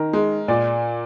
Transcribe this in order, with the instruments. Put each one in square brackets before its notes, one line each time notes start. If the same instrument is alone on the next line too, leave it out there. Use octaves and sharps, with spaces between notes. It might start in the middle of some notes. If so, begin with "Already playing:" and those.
Already playing: [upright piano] D#3 [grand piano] A#4
[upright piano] G#3
[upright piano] A#2 [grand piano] D5